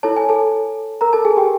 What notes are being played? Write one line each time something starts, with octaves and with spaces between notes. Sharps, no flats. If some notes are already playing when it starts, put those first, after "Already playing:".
E4 A4 C#5 A5
G#5
A4 A5
A#4 A#5
A4 A5
G#4 G#5
G4 G5